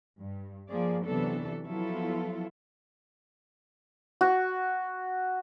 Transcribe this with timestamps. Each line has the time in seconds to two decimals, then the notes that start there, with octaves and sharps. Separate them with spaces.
0.19 G2
0.70 F3 A#3 G#4 D5
1.05 C3 E3 F#3 B3 D4 A4
1.66 F3 F#3 B3 E4 F4 A4
4.21 F#4